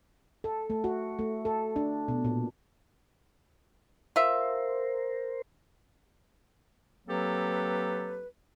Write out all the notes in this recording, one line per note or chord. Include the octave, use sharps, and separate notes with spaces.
A4
A3
F#4
A3
A4
D4
B2
A#2
F4 A#4 C5 E5
F#3 A#3 C4 G4 A4 B4